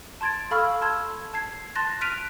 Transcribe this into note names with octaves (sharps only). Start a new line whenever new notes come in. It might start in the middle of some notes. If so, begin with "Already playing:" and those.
A5 C6 G#6 A6 D7
A4 F5 B5 C#6 E6 F6
A5 C6 E6 G#6
A5 G#6 C7
A5 C6 F#6 A6 A#6
F6 F#6 B6 D7 D#7 F7